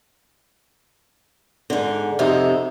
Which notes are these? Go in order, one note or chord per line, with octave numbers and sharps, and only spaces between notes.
G#2 D3
F2 C3 D#4